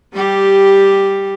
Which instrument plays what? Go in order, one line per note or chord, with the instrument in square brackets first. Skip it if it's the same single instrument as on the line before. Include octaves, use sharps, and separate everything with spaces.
[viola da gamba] G3 G4